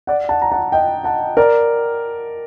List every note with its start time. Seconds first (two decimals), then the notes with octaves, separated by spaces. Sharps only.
0.07 D5 F#5
0.29 F#5 A5
0.42 A#5
0.52 F#5 A5
0.72 D#5 G5
1.04 F#5 A5
1.37 A#4 D5